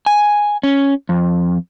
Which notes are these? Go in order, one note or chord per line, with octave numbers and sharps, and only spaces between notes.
G#5
C#4
F2